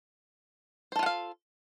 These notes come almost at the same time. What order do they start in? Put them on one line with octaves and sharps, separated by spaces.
C5 A4 F4 F#5 F5